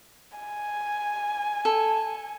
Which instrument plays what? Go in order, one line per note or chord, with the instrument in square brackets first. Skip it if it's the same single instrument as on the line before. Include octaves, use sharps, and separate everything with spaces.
[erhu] G#5
[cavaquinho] A4